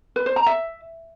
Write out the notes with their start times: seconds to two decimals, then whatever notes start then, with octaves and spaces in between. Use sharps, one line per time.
0.16 B4
0.26 C5
0.36 A#5
0.46 E5